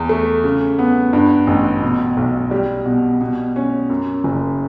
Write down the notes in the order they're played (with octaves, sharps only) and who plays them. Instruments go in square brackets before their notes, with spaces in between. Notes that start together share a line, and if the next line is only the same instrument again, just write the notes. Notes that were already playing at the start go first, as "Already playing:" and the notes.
Already playing: [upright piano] E2
A3
C#3
B3
G2
A1
B2
B1
G3
B2
B2
C#4
F#2
F#1